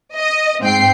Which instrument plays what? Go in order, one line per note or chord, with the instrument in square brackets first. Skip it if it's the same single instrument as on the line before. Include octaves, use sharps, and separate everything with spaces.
[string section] D#5
G#2 C4 G5 C7